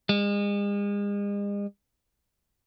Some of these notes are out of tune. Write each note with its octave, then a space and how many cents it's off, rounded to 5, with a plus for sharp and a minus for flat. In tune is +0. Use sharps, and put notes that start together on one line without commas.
G#3 -40